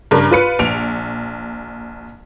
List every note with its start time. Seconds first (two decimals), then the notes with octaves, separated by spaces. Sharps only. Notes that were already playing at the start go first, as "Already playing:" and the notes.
0.11 G2 C#3 A#4
0.31 F4 B4 C#7
0.59 A#1 D7 F7